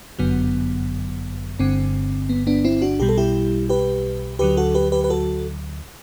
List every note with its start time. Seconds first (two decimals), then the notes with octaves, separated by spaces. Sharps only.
0.19 G1 F#2 D3 F#3 B3
1.59 G1 G2 D3 C4
2.29 B3
2.47 B3 D4
2.64 C4 E4
2.82 D4 F#4
3.00 B1 B2 G3 G4
3.09 A4
3.17 E4 G4
3.69 G4 B4
4.39 D2 D3 F#3 G4 B4
4.57 F#4 A4
4.74 G4 B4
4.92 G4 B4
5.04 B4
5.10 F#4 A4